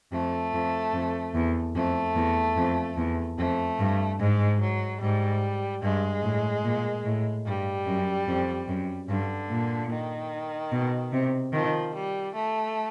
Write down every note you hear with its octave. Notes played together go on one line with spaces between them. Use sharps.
F2 A3
F2
F2
E2
F2 A3
E2
F2
E2
F2 A3
G2
G#2 G#3
F#3
G#2 G3
G2 G#3
A2
A#2
A2
G2 G3
F#2
F2
F#2
G2 D3
A#2
D#3
B2
C3
D#3 F3
G3
A3